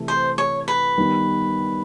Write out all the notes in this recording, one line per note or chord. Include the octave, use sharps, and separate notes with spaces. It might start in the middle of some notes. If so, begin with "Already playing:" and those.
Already playing: C3 E3 A3
C5
C#5
B4
D#3 G3 B3